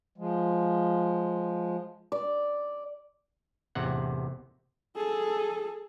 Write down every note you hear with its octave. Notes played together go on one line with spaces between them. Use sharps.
F3 G#3
D5
A1 E2 C3 F#5
G#4 A4